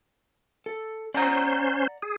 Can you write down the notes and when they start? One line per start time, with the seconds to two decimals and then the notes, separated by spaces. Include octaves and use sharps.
0.66 A4
1.14 C#4 C5 D5 F#5 A#5
2.02 G#4